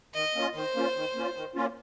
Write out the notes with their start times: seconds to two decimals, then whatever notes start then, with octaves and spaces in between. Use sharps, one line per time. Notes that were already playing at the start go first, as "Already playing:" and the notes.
0.14 D#3 D#5
0.35 A#3 C#4 F4
0.55 D#3 C5
0.75 A#3 C#4 F4
0.95 D#3
1.15 A#3 C#4 F4
1.35 D#3
1.55 A#3 C#4 F4